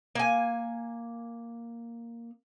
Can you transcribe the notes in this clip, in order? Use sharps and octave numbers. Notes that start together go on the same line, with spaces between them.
A#3 G#5